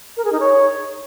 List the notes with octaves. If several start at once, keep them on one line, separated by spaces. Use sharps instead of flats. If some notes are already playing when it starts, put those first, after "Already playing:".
A#4
G#4
D#4
C#5